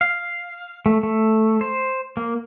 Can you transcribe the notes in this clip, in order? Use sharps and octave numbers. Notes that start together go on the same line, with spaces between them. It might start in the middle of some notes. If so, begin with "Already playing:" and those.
F5
A3
A3
C5
A#3